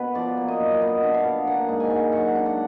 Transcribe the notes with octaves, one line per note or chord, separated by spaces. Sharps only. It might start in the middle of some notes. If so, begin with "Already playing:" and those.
Already playing: B2 B3 B4
F3 D5
A#3
D#5
F#2
B3 D#5
D4
F5
B2
A#3 F#5
G#2
G#5
G#2
F#3 F#5
D4
F#5